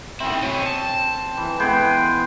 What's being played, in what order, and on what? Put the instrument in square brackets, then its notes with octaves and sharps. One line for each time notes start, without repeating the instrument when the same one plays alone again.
[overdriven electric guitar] G#2 E4 [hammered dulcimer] C4
[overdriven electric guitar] B2 C#4
A5
[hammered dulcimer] E3
[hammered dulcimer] G#3 B3 G#4 [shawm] G5